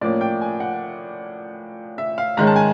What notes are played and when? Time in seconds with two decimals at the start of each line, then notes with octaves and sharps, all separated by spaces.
0.01 A2 F3 A#3 C#4 D5
0.21 G5
0.41 G#5
0.60 F#5
1.98 E5
2.18 F5
2.37 G#2 D#3 G#3 C#4 A#5
2.47 A5
2.56 G#5